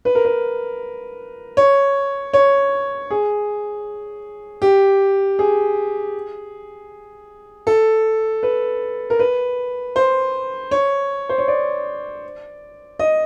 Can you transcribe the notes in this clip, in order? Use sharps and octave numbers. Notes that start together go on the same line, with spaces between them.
B4
A#4
B4
C#5
C#5
G#4
G4
G#4
A4
B4
A#4
B4
C5
C#5
C5
C#5
D5
D#5